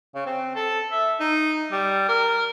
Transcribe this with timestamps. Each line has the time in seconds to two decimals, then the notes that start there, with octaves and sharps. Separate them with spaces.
0.15 C#3
0.26 C4
0.56 A4
0.92 E5
1.20 D#4
1.72 G3
2.08 A#4